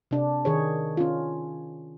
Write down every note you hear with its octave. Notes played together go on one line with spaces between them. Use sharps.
C3 D4
D#3 G#4 C#5
C#4 F4